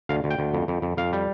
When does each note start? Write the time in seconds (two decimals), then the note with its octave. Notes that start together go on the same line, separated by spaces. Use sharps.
0.09 D2 F5
0.24 D2
0.31 G5
0.39 D2
0.53 F2
0.68 F2
0.82 F2
0.97 F2 F5
1.13 G3